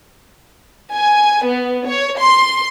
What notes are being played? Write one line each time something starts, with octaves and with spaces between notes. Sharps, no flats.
G#5
B3
C#5
C6